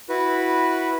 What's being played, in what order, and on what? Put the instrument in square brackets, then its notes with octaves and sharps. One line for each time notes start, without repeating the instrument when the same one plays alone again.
[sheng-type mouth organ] E4 F#4 B4